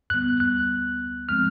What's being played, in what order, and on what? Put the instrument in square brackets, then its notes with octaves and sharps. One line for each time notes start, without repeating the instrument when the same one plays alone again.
[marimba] D2 D3 G3 B3 [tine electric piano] F#6
[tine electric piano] F#6
[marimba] F3 G#3 C4 [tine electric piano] F6